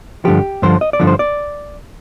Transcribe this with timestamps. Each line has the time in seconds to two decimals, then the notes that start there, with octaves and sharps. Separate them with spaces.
0.25 G2 D3 F3 G4
0.62 G2 D3 F3 C5
0.81 D#5
0.93 D5
1.00 G2 D3 F3
1.07 C5
1.19 D5